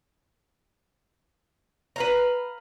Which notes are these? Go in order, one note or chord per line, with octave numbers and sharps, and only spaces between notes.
B4 F5 A#5